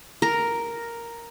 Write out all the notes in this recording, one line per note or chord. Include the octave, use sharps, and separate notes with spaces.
A#4